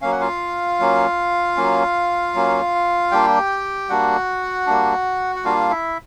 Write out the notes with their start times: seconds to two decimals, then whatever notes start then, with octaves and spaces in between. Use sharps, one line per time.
0.01 F#3 A#3 C#4 F5
0.12 F#5
0.21 F4 F5
0.80 F#3 A#3 C#4
1.57 F#3 A#3 C#4
2.34 F#3 A#3 C#4
3.11 G3 A#3 D4 G4 G5
3.89 G3 A#3 D4 F#4 F#5
4.66 G3 A#3 D4
5.36 F#5
5.45 G3 A#3 D4 F4 F5
5.70 E4 E5